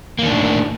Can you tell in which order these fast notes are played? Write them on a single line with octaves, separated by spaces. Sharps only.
A#3 D#3 D4 A2